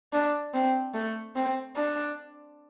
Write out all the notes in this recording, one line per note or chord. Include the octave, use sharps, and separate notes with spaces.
D4
C4
A3
C4
D4